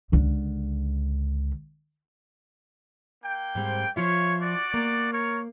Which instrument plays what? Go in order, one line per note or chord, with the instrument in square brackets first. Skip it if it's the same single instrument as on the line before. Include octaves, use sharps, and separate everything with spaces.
[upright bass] C#2 D3
[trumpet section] A#3 G5
[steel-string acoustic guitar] G#2 G3 C4
[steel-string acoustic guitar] F3 F4 E5 [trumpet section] C#5
[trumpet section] F#4 D5
[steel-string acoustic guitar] A#3
[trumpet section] A#4 C#5